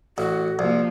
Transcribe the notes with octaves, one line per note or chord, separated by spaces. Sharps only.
A1 F#4
C2 F3 A#3